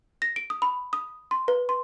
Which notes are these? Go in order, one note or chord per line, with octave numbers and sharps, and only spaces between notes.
A#6
D7
D#6
B5
D#6
C6
B4
C6